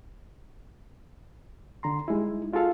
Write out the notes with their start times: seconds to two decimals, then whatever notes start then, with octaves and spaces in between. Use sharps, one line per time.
1.83 D3 A#5 C6
2.08 G3 G#3 D#4 E4
2.53 D#4 F4 F#4 G#4 A4 F5